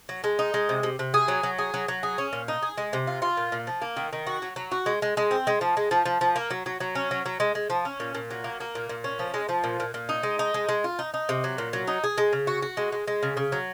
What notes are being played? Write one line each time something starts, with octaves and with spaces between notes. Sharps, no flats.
F#3
G#3
D#4
G#3
C3
C3
C3
G#4
F#3
F#3
G#4
F#3
F#3
G#4
C#4
A#2
D#4
G#4
G#3
C3
F4
F4
A#2
A#2
F3
A#3
D#3
D#3
F#4
F#3
F#3
F#4
G#3
G#3
G#3
C4
G#3
F3
G#3
F3
F3
F3
A#3
F#3
F#3
F#3
C#4
F#3
F#3
G#3
G#3
F3
C#4
A#2
A#2
F#3
A#3
A#3
A#2
A#2
C#4
F3
G#3
F3
A#2
A#2
A#2
D#4
G#3
D#4
G#3
G#3
F4
D#4
D#4
C3
F#3
A#2
F#3
D#4
G#4
G#3
C#3
F#4
F#4
G#3
G#3
G#3
C#3
C#3
F#3